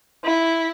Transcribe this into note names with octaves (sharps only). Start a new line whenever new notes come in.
E4